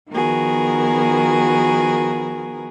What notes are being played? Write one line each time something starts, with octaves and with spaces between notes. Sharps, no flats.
D#3 F3 B3 F#4 G#4 A#4